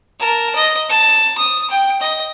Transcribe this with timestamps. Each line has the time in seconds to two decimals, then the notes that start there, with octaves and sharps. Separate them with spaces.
0.19 A#4 A5
0.55 D#5
0.89 A5
1.38 D#6
1.70 G5
2.01 D#5